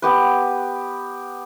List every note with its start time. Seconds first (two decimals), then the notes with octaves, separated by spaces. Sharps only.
0.02 B3 G4 B4